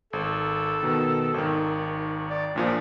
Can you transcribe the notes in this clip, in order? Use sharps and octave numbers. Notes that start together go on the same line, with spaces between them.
G#1 A4
B2 D#3
G#1 D#3
D5
A#1 A#2 F3 D4